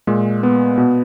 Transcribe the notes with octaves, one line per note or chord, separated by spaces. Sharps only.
A#2 G#3
B3
B2